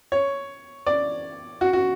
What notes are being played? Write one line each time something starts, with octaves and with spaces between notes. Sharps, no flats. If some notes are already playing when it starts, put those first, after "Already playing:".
C#5
D5
F#4
F#4